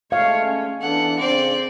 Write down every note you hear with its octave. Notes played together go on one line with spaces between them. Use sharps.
G#3 A3 C#5 F5
C#4
E3 B3 D4 A4 F#5
C#3 C4 D5